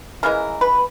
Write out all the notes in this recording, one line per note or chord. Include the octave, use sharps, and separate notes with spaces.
C#3 E3 G#3 A#4
B4